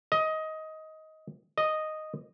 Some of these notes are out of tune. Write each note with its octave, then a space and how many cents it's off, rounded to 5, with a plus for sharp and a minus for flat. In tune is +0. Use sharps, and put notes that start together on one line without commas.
D#5 +15
D#5 -5